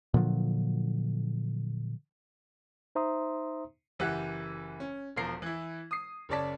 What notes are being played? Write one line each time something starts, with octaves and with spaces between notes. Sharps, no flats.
A#2 D3 F3 F#3
D#4 C5 E5 A#5 C6 D#6
F#1 E3 G4 E5 F#5 F#6
C#4
E1 E2 F3 A#4 C7
E3 E4
D#6 C7
F#1 C#3 C#5 D5 A5 B6